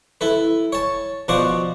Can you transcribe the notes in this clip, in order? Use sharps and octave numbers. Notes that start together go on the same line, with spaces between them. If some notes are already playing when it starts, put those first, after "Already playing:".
E4 A4 B4
C#5 A5
B2 F3 F#4 C5 D5